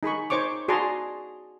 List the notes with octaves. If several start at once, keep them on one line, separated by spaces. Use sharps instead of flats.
D#4 G#4 B5 C#6
D#4 C5 C#5 C#6 D6
F#4 G#4 D5 A5 A#5 C6